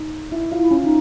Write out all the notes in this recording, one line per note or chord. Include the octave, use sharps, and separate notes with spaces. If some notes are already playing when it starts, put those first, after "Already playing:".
Already playing: D#4
E4
F4
E4
C#4
D#4